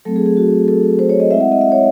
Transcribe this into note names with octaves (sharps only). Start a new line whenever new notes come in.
F#3 A3 C4 A4
G#4
G#4
F#4
A4
C5
C#5
D#5
G#3 C4 E4 E5
F#5
D#5
E5
C#5